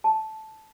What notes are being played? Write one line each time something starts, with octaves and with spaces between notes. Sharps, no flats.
A5